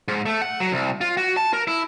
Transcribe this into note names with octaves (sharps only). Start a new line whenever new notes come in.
G#2
A3
F#5
F#3
C2
F4
F#4
A5
A#4
E4